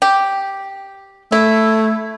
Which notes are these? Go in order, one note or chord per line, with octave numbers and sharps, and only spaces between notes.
G4
A3 E4